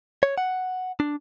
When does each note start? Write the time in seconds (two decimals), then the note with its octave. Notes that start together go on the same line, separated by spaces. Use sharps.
0.23 C#5
0.38 F#5
1.00 D4